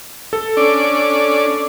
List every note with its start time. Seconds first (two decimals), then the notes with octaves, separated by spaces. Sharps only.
0.33 A4
0.57 C#4 D4 D5